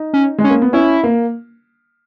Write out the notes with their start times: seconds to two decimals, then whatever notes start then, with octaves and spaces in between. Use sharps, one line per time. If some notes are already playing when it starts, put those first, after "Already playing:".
Already playing: D#4
0.14 C#4
0.38 G#3
0.44 C#4
0.50 A#3
0.62 B3
0.73 C#4 E4
1.03 A#3